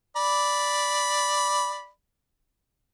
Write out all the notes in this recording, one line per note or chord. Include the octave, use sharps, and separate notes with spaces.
D5 B5